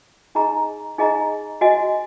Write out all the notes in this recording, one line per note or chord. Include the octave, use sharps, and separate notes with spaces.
D#4 G#4 D#5 A#5
D#4 G#4 D#5 A#5
F#4 D#5 G#5